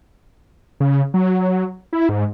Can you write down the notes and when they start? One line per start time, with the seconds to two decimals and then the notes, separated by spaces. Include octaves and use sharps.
0.80 C#3
1.14 F#3
1.93 E4
2.09 G#2